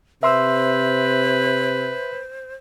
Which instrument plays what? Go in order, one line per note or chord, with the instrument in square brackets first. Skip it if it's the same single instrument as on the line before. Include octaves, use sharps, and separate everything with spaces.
[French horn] C3 [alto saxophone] B4 [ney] C5 [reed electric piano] E5 C6 E6